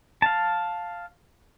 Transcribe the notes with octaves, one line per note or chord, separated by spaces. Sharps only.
F5 A5